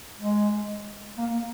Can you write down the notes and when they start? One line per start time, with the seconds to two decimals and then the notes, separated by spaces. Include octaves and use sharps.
0.18 G#3
1.18 A#3